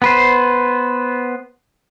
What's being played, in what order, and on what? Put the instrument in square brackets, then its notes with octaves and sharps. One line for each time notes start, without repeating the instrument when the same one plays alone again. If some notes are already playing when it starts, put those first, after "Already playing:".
[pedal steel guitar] B3 B4 C5